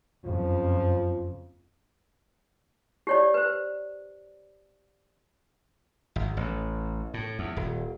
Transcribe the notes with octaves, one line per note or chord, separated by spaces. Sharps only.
F#1 F2 C#3 F3
G4 C#5 D5
B4 C5
G#1
A1
A2
E2
D#1